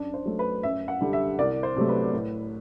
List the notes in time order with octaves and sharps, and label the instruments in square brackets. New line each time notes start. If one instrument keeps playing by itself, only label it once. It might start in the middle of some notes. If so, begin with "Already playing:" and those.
Already playing: [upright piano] F#2 D4
C5
F#3 A3
B4
F#2 E5
F#5
D3 G3
E5
C2 D5
C5
C3 F#3 A3
B4
A2